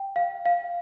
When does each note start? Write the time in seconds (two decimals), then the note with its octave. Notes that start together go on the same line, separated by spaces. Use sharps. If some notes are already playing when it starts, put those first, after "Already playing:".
Already playing: G5
0.16 F5
0.46 F5